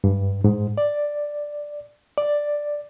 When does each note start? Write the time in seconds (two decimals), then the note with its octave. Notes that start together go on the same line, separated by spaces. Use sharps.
0.04 G2
0.44 G#2
0.78 D5
2.18 D5